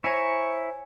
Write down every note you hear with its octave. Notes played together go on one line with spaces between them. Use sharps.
E4 C5 C#5 E5 G#5 A#5 C#6